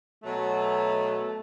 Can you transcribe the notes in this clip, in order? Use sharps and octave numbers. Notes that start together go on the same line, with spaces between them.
B2 F#3 A3